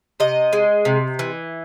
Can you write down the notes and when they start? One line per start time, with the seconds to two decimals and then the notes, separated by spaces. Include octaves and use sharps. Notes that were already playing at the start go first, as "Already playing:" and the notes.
0.20 C3 D#5
0.53 G#3
0.85 C3
1.19 E3